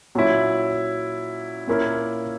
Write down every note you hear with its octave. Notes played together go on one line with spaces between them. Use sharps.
A#2 F#3 C#4 E4
A#2 A#3 C#4 E4